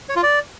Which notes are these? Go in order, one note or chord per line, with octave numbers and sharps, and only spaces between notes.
C#5
F4
D5